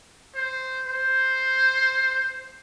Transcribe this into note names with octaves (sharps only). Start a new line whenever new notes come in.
C5
C5